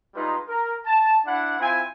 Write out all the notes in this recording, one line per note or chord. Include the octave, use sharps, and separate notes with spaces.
G3 G#3 D#4 F4 B4
A#4
A5
D4 E4 F#5
C4 E4 F4 G#5